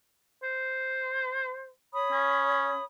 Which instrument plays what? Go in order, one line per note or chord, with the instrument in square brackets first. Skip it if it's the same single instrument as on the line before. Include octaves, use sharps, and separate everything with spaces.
[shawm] C5
[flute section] C#5 B5 D#6
[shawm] C#4